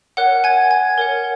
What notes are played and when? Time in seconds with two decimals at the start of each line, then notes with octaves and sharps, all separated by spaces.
0.17 A#4 C#5 F#5 F#6
0.44 G#5 G#6
0.71 G#5 G#6
0.98 A#4 C#5 F#5